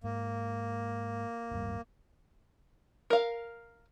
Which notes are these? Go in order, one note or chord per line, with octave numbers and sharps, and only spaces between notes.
G#2 A#3
D1 G2 G3
A#4 F5